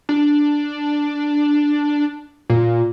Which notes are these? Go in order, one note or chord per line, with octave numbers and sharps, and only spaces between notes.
D4
A#2